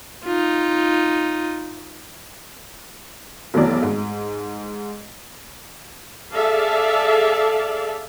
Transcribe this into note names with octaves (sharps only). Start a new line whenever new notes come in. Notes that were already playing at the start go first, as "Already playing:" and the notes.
D#4 F4
F1 B1 B2 E3 F#3 D5
G#2
G#4 A4 D5 E5 F5 A5